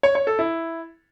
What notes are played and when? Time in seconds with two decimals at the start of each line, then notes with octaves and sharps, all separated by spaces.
0.03 C#5
0.15 C#5
0.27 A4
0.39 E4